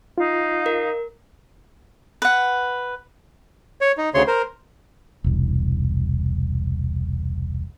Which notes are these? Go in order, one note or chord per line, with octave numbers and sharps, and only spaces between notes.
D#4 F4 F5
A#4
B4 F#5
C#5
D#4
D2 C#3 C#5 C6
A#4 C5
E1 C2